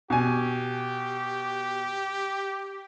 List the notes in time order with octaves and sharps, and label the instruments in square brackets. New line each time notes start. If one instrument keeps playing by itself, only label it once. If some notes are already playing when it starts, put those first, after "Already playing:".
[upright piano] B2 G#5 [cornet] G4